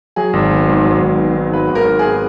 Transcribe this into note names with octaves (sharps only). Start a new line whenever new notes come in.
F#3 G#4
G#1
B3
G#2
F#3
G#1
B3
G#2
F#3 B4
G#1 A#4
B3
G#4